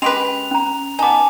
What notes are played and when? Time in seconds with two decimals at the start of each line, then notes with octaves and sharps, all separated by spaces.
0.02 G#3 C#4 G4 B4 C6 F7
0.51 C#4 A#5
0.99 B3 D#4 G#5 A5 D6